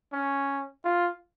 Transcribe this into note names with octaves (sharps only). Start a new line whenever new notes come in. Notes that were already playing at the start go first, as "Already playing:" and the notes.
C#4
F4